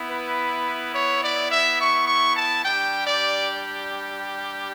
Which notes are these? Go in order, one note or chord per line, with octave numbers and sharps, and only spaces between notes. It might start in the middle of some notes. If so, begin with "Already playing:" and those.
Already playing: B3 E4
B4
C#5
D5
E5
C#6
C#6
A5
G3 D4 G4 G5
D5